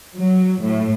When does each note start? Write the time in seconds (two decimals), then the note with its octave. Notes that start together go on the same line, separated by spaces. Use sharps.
0.17 F#3
0.62 A2